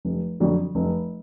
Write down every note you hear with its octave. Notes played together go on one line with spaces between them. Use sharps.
F1
F2 D3 F#3
F1